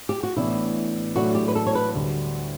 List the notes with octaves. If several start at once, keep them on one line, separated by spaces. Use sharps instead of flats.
G4
F#4
A1 A2 E3 B3 D4 E4
A2 F#3 A3 D4 F#4
G4
B4
A4
C#5
B4
D2 D3 G3 D4 F#4